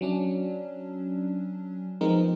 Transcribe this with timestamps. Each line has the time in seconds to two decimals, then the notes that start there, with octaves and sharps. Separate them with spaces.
0.01 F#3 C#4 D4
2.01 F3 G#3 B3 C4 D#4 A#4